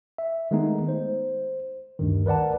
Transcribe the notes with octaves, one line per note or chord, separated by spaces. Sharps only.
E5
D#3 G#3 A3 B3 D#4
C5
D2 G2 D#3
A#4 B4 D5 F#5 A5